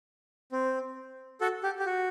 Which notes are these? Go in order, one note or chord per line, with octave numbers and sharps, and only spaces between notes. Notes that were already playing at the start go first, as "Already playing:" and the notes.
C4
F#4 A4
G4
G4
F#4